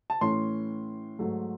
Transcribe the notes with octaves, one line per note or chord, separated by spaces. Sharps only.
A5
A2 E3 A3 C#4 C6
G#2 F#3 A3